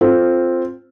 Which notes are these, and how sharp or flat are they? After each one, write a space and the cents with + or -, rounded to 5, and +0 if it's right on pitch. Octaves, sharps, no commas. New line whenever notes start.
C4 +0 F4 +0 A4 +0